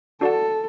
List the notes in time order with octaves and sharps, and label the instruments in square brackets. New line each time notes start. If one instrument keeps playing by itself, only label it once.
[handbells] D4 F#4 D5 F#5 A5 [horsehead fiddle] A4